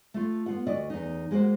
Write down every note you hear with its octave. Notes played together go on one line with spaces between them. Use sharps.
A3 F4
B3 F4 F#5
D2 F#4 D5 D#5
E2 D#4
G#3 A#3 F#4 C5